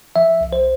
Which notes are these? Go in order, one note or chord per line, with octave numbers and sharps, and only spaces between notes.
F3 E5
C2
C5